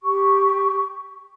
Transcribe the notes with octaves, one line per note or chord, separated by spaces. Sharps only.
G4 C#6